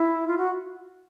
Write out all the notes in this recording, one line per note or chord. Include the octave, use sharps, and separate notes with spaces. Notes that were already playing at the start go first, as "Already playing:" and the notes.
Already playing: E4
F4
F#4